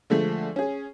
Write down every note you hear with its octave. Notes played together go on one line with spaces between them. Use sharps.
D3 F3 G#3 A3
C#4 G#4